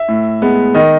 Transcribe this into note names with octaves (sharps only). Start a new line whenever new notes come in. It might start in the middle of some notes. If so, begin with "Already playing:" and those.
Already playing: E5
A2
G#3 B3
D#3 D#5